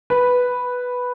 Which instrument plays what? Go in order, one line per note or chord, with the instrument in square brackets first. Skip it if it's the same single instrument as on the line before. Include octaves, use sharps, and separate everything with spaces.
[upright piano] B4